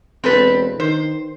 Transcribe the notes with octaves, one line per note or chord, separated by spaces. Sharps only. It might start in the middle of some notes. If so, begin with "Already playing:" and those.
E1 C4 A4 B4
D#3 C5